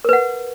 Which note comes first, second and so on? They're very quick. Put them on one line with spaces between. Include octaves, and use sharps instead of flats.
A#4 B4 F#5